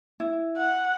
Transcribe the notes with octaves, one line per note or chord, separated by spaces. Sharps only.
E4
F#5